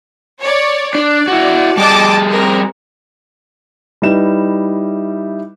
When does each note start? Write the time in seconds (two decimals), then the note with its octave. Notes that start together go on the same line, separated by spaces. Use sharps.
0.42 C#5 D5
0.95 D4 D5
1.28 E4 F#4
1.77 G3 G#4 D#5 A5 D6
2.32 C4 A#4
4.02 G3 D#4 E4 B4 E7